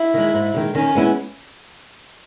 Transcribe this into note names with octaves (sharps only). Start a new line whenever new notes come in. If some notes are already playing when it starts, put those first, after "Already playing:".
Already playing: E4
D#3 G#3
G#2
D#3 G#3
D#3 C#4
G#3 B3 E4